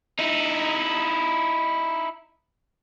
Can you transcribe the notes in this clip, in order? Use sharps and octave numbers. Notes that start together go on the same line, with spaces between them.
D#4 E4